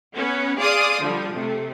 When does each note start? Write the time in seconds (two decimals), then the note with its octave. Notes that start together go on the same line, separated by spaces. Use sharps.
0.15 B3 C#4 B4
0.57 G#4 D5 F5 C6 D6 D#6
1.00 D3 F3 G3
1.31 C3 A3